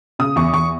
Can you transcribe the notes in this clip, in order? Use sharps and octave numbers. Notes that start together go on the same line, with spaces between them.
C#3 D#6
E2 C#6
E2 C#6